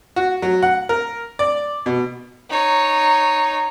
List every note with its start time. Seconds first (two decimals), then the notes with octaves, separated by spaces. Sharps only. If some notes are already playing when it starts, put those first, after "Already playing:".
0.16 F#4
0.42 F#3
0.62 F#5
0.89 A#4
1.39 D5
1.86 B2
2.50 D#4 C#5